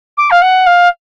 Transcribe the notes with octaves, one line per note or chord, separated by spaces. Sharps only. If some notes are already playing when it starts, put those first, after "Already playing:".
D6
F5
F#5
F5